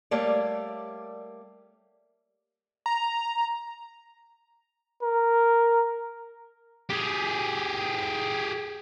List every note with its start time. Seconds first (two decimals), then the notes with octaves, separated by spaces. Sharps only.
0.11 G3 A3 A#3 C#5 D5
2.86 A#5
5.02 A#4
6.90 G4 G#4